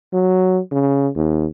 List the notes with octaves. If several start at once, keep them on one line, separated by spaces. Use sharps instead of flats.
F#3
C#3
D#2